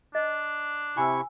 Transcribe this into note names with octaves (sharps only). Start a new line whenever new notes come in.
D4 D#5
C3 E4 G#5 C#6 E6